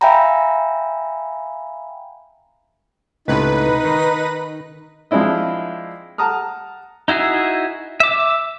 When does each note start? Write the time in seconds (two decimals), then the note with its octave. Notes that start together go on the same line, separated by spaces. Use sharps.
0.01 E5 F5 G5 G#5 A#5 B5
3.28 C#2 A2 C3 D#4 B4
3.85 D#3
5.11 F3 G#3 C4 D4 E4 D#5
6.18 F#5 A5 A#5 D#6 F6
7.08 D#4 E4 F#4 G#4 E5
8.00 E5 D6